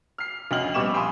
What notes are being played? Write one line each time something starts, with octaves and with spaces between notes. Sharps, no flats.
F6 C7
D2 C#4 D#5 G5 F6 F#7
A#1 G3 B3 C#6 D6 E7
F5 G5 G#5 B5 C6 D#6